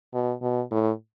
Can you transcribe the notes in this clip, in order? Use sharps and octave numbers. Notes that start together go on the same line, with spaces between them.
B2
B2
A2